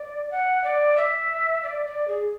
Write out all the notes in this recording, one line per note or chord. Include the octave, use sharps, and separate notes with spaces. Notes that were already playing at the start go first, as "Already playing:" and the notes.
Already playing: D5
F#5
D5
E5
D5
D5
G#4